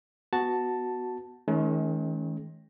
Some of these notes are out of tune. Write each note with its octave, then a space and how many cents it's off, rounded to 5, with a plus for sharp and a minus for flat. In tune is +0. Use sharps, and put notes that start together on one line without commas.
B3 +0 F#4 +0 A5 +0
D#3 +35 G#3 +45 C#4 +0